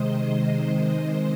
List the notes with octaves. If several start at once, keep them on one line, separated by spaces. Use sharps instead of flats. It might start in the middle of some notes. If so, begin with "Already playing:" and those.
Already playing: C3 D#3 G#3 C5 D#5